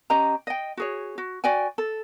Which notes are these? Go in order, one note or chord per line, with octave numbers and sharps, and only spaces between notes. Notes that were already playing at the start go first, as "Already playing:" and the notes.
C#4 G4 D#5 A#5
D#5 G5
F#4 G#4 C#5
F#4
F#4 D5 G5 G#5
A4